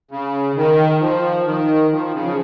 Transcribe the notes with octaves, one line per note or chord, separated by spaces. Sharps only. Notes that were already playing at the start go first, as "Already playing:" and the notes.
C#3
D#3
F3
D#3
F3
C#3
F3